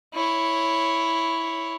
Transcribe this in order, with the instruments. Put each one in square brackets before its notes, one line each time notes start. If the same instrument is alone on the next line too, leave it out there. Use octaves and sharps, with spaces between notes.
[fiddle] E4 C#5